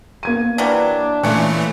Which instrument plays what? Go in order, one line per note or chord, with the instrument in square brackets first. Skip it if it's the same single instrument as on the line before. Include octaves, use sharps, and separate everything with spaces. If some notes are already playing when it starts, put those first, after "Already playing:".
[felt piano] A#3 G#6 D#7
[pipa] E3 F#3 G3 [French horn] D4
[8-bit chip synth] A#2 E3 A3 [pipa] C#3 C#4 [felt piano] F#6 C#7